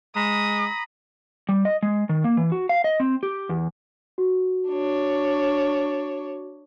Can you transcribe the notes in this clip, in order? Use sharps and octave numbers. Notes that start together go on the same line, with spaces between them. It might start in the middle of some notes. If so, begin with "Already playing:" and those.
G#3 A#5 B5 D#6
G3
D#5
G#3
D#3
A#3
E3
F#4
F5
D#5
C4
G4
E2
F#4
D4 C#5